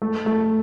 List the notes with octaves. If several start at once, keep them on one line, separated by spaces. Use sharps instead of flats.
A3
A3